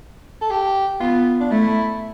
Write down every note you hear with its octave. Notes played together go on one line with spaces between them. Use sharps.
A4
G4
B3 F4
D4
A3 E4